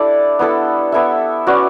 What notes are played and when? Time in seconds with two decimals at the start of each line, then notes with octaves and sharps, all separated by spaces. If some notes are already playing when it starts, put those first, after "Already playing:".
Already playing: D4 E4 G4 A4 D5
0.39 B3 E4 A4
0.92 B3 E4 A4 E5
1.47 C#4 F#4 B4 D5